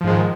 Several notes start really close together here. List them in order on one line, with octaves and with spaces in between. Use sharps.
F3 G#2 G#3 D#3